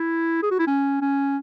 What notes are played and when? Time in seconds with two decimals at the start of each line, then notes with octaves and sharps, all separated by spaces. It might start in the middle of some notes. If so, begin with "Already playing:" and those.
Already playing: E4
0.43 G#4
0.51 F#4
0.59 E4
0.67 C#4
1.02 C#4